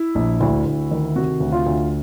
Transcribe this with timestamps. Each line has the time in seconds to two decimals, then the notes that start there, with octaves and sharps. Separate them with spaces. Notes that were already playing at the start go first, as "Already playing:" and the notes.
Already playing: E4
0.15 A#1
0.40 D2 E4
0.66 D2
0.91 D#3
1.15 C3 F#4
1.40 D2
1.52 F4
1.66 D2